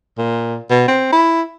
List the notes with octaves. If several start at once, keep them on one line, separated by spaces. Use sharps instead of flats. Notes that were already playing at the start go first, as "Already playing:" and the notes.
A#2
B2
C4
E4